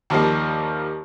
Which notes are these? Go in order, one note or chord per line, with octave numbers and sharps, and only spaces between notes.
D#2 F3 G3 A#3